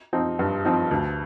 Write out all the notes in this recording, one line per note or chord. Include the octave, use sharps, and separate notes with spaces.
F3 C4 D#4
G2
F3 C4 D#4
D2